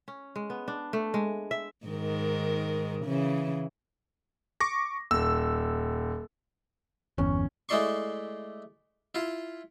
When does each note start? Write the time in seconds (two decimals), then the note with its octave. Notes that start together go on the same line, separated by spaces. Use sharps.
0.08 C#4
0.36 G#3
0.50 B3
0.68 D4
0.93 A3
1.14 G#3
1.51 E5
1.87 G#2 D#3 A#4
3.05 C#3 E3
4.60 C#6 D6 A#6
5.11 D#1 E6
7.18 G1 E2 C#4
7.69 G#3 A3 E4 D5 C6 C#6
9.15 E4 F4